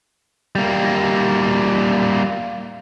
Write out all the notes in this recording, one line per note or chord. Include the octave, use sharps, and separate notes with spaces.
G3 A#3